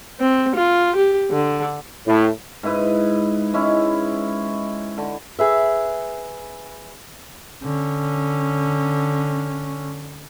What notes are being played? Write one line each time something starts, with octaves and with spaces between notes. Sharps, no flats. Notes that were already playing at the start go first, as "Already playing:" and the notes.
C4
F4
G4
D3
A2
G#2 E4 B4 D#5
G#3 C#4 E4
D3
G#4 B4 E5
D3 C#4